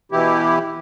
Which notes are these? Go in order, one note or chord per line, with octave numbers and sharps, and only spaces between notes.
B2 E3 E4 G4